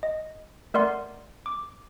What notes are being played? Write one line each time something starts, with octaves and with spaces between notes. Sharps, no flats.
D#5
A3 A#4 D5 F#5 C6
D6